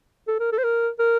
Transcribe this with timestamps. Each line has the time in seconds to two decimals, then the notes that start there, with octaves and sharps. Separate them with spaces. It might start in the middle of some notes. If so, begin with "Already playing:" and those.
0.28 A4
0.40 A#4
0.52 A4
0.58 C5
0.64 A#4
0.99 A#4